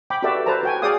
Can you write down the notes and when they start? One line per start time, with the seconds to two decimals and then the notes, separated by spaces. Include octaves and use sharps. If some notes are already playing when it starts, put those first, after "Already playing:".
0.10 G5 B5 D6
0.22 F#4 G4 A4 B4 D5 E5
0.46 A4 B4 C5 A5 A#5
0.63 F#4 G5 G#5
0.82 G#4 D5 F5 G5 D#6